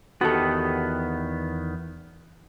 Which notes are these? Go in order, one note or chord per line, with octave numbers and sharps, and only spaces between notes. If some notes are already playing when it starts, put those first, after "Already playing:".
E2 D#3 B3 F#4 G4 A4